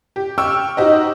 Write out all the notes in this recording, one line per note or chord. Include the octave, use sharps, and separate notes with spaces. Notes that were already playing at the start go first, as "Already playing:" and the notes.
G4
G5 C#6 E6 F6
D#4 F#4 G4 C5 D#5